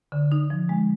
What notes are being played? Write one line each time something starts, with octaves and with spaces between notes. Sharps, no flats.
D3
D#4
F3
G#3